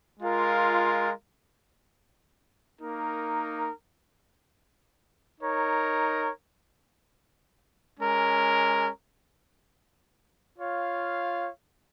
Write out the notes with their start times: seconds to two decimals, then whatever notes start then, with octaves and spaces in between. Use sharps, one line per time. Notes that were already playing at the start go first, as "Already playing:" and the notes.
0.20 G#3 F4 A#4
2.80 A#3 D#4 A#4
5.39 D#4 A#4 C#5
7.99 G#3 C#4 A#4
10.58 F4 C#5 F5